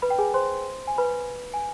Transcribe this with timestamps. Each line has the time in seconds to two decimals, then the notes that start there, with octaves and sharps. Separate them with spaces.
0.02 B4 B5
0.10 G5
0.19 G#4 G#5
0.34 C5 C6
0.87 G#5
0.98 B4 B5
1.54 G#5